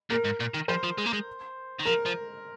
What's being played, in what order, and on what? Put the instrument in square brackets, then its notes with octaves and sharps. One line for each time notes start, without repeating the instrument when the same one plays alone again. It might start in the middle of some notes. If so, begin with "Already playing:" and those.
[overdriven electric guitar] A#2 [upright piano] A#4
[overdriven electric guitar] G#2
A#2
D#3
[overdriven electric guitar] F3 [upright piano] C5
[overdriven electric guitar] F3
G#3
A#3
G#3
D#3
[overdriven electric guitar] F3 [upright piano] A#4
[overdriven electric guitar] F3